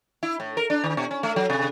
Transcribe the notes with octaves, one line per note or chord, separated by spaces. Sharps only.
E4
A2
A#4
D4
D#3
B2
C#4
A3
F#3
C3